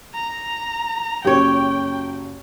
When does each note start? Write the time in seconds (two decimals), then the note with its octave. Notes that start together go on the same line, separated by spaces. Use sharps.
0.14 A#5
1.25 F#1 F#3 C#4 G4 C#5 G5